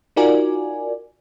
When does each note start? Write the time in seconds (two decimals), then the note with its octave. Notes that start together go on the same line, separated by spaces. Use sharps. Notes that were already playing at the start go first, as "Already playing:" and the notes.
0.16 D#4 F4 F#4 A#4 D5 G#5